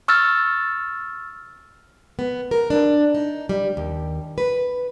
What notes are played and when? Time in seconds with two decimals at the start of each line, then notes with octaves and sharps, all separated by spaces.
0.08 C#6 E6 F6 A6
2.19 B3
2.51 A#4
2.70 D4
3.15 D#4
3.49 G3
3.77 D#2
4.38 B4